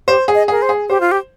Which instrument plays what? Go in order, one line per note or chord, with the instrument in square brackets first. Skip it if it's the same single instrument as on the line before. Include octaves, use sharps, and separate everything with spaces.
[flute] G4 [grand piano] C5
[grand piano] G#4
[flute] D#5
[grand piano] G#4 [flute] A#4
[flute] C5
[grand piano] G#4
[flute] G4 [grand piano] C5
[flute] F4
G4